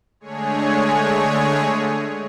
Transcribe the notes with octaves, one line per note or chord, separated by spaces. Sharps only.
D3 G#3 A3 G#4 C#5